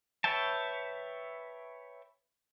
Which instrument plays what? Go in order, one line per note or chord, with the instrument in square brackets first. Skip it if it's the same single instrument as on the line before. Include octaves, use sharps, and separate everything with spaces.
[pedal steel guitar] B4 C#5 E5 G5 A5